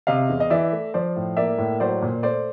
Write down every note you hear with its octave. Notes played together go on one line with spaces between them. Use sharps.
C3 D#5 F5
E2
D#5
E3 D5 E5
A3
F3 C5 D5
A2
A#3 D5 E5
A2
F#3 C5 D5
A#2
A3 C5 D5